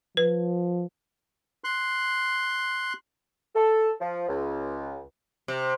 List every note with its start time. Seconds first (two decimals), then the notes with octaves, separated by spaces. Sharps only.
0.17 F3 B4
1.64 C6 F#6
3.55 A4
4.00 F3
4.28 C#2
5.48 C3